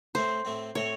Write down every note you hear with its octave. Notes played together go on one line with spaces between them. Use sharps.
A2 A3 C4 C5
A2 A3 C4
A2 A3 C4 C#5